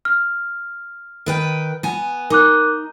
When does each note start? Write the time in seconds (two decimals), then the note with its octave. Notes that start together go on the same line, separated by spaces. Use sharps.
0.05 F6
1.26 D#3 B4 G5
1.83 B3 G#5
2.30 D#4 A#4 D6 F#6